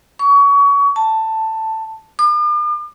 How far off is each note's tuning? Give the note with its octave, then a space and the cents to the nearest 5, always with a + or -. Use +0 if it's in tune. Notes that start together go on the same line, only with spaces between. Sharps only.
C#6 +30
A5 +10
D6 +45